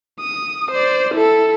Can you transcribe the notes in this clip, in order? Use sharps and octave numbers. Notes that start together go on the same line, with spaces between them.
D#6
C5 D5
E4 A4